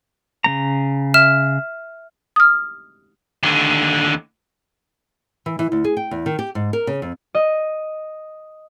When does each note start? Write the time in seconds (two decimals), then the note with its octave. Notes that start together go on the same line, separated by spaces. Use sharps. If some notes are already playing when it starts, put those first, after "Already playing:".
0.44 C#3 A#3 A#5
1.14 E5 F6 E7
2.36 D#6 F6
3.43 D#2 D3
5.46 E3
5.59 E3
5.72 D2
5.84 G#4
5.97 G5
6.11 E2
6.26 D#3
6.39 G4
6.55 G#2
6.73 A#4
6.87 C#3
7.02 F2
7.35 D#5